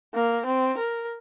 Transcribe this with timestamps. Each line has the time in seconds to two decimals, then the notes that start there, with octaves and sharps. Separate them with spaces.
0.14 A#3
0.46 C4
0.78 A#4